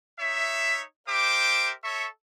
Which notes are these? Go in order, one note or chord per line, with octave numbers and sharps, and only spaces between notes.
D#4 C#5 E5
G4 A#4 C5 E5 D6
A4 C#5 E5 C#6